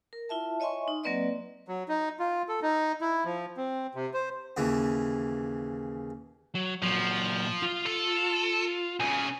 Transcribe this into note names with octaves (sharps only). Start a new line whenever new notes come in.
A#4
E4 F4 E5 A5
C#5 D#5 E5 G#5 C6 C#6
D#4
F#3 A#3 C4 B4 D5 D#5
F#3
D#4
F4
A4
D#4
E4
F3
C4
C3
C5
D#2 C#3 E3
F#3
A#2 F3 F#3
F4
A4
B1 C#3 G#5